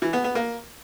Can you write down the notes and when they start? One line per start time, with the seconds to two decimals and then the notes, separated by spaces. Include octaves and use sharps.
0.02 E3
0.13 B3
0.24 B3
0.35 A#3